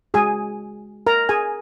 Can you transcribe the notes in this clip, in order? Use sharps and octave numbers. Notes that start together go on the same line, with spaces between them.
G#3 F#4 G#4 G#5
A#4 A#5
G#4 G#5